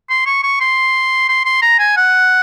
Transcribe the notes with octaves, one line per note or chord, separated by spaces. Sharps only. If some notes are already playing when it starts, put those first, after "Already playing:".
C6
C#6
C#6
C6
C6
C6
A#5
G#5
F#5